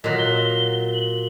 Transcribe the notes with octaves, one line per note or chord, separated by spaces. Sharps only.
A#2 F#3 D#5
G7
F#7